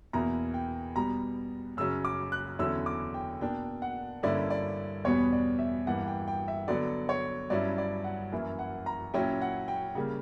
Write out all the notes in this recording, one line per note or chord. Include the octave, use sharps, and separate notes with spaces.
E2 B2 A#3 E4 A#5
G5
B2 G3 B3 A#5
F#2 C#3 F#3 C#4 E6
D6
F#6
E2 D3 F#3 C#4 E4 E6
D6
G5
B2 A#3 D4 G5
F#5
G2 D3 A#3 C#4 E4 D5
D5
E2 B2 G3 B3 C#5
D5
E5
G2 E3 A#3 F#5
G5
G5
E5
D3 F#3 B3 D5
C#5
G2 F#3 C#4 E4 D5
D5
F#5
F#2 E3 A#3 E4
F#5
A#5
A#2 F#3 C#4 E4 G5
F#5
G5
C#3 G3 A#3